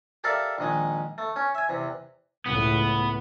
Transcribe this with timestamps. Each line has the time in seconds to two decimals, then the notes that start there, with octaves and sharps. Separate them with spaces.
0.24 G4 A4 A#4 D5 E5 F5
0.58 A#1 D#3 G#3
1.18 A3
1.36 C#4
1.55 E5 G#5
1.69 E2 C3
2.46 C#2 A2 B3